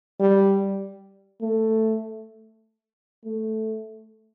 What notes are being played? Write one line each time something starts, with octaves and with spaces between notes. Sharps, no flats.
G3
A3
A3